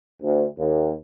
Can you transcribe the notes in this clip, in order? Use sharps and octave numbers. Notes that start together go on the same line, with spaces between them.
D2
D#2